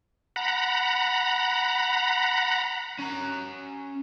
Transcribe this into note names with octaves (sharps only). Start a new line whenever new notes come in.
F#5 A#5 B5
C#4 A#5